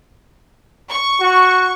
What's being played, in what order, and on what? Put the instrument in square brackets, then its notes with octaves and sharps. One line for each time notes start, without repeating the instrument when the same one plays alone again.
[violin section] C#6
[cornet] F#4